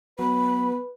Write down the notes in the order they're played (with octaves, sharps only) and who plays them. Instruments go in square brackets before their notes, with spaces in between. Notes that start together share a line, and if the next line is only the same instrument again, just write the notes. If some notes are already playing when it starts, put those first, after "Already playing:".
[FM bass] F#3 [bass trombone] B3 [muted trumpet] B4 [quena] B5